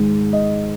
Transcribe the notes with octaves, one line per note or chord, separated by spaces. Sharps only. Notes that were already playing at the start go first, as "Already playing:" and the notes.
Already playing: G#2 D#3 G#3
D#5